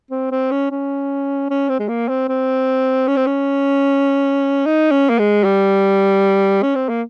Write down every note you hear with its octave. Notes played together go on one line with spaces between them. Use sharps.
C4
C4
C#4
C#4
C#4
C4
G#3
A#3
C4
C4
C#4
C4
C#4
D#4
C#4
A#3
G#3
G3
C#4
C4
A#3